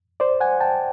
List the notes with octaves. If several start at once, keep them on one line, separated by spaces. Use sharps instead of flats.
C5 D5
F#5 G#5
G5 A5